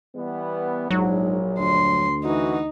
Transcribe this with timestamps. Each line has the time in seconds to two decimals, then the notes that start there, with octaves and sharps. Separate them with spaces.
0.15 E3 G3 B3
0.91 A#1 G#2 F#3
1.59 D2 C6
2.24 E3 D#4 F#4